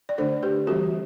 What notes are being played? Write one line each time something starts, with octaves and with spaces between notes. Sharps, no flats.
D5
D3 A3 D4 A4 C5
G4 B4
E3 G3 C4 F#4 A4